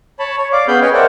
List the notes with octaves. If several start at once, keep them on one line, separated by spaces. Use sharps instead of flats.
C#5 A5 B5
C#5
D5 F5 D6
B3 C#4 G#4 F5 B5 G6
B4 C#5 D#5 G5 G#5
A#4 C5 D5 E5 F#5 G5